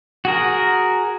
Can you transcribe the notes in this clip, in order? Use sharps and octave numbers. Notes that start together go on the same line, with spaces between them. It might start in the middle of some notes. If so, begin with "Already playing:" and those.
F#4 G#4 A#4